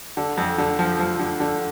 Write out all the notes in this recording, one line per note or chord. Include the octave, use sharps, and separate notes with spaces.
D3
F2
D3
F3
F3
D3
D3